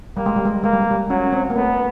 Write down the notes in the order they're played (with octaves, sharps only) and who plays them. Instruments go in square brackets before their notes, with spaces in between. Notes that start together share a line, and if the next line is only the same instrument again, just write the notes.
[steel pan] G3 [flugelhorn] A#3
[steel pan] G#3
G3
G#3
G3
[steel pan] G#3 [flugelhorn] A#3
[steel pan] G3
G#3
G3
[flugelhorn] F#3 [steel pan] C#4
[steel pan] C4
A#3
[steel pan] A3 [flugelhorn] B3